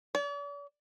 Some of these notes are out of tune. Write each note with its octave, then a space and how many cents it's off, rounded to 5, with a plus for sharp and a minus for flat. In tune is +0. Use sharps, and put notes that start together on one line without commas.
D5 -45